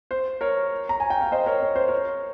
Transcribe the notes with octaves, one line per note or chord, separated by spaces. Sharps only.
C5
A#4 C#5
A#5
G#5
G5
F5
C5 D#5
A#4 C#5
C#5
C5
A#4 C#5